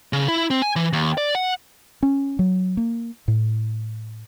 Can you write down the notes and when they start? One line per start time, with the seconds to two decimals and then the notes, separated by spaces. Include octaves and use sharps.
0.13 C#3
0.28 E4
0.50 C4
0.62 G#5
0.76 E3
0.93 D#2
1.18 D5
1.35 F#5
2.03 C#4
2.39 F#3
2.77 A#3
3.28 A2